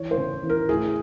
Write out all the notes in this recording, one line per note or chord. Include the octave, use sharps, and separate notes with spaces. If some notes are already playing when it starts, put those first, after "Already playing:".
Already playing: E3 C#5
C5
C#3
E3
A#4
A2 G#4